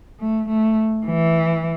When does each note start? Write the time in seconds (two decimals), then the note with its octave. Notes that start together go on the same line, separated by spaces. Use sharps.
0.20 A3
0.49 A3
1.06 E3